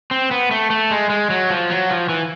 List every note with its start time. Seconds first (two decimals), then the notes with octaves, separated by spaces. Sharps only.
0.11 C4
0.31 B3
0.51 A3
0.70 A3
0.91 G#3
1.10 G#3
1.30 F#3
1.50 F3
1.70 F#3
1.90 F3
2.09 E3